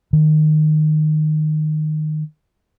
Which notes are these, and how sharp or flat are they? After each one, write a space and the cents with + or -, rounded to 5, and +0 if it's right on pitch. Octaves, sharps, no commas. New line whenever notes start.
D#3 -15